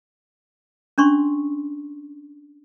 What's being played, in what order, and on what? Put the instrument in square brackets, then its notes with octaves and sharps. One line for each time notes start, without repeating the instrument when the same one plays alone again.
[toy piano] C#4 D4 C6 C#6